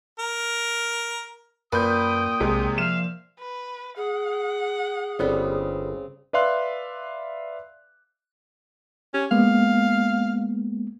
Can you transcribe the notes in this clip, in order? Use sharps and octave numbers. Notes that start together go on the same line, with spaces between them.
A#4
F#2 A#2 B4 G5 D#6 G6
B1 C3 G#3
F3 E5 F5 E7
B4
G#4 F#5
G1 C#3 G3 B3 C4
B4 D5 E5 F5 C6 F#6
C#4 G4
G#3 A#3 B3 F5